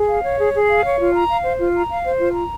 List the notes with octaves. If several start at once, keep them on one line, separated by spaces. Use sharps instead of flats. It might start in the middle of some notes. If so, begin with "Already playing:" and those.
Already playing: G#4
F5
C#5
G#4
G#4
F5
C#5
F4
A#5
F5
C5
F4
A#5
F5
C5
F4
A#5